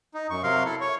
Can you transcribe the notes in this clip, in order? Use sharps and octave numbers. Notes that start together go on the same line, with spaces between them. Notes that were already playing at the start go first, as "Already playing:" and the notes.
D#4
F#2 C#6
C3 F#3 A#4 F5 C6
E4 A4
C#5 C#6